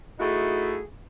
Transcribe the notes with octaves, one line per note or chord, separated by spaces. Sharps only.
A3 D#4 E4 F#4 G#4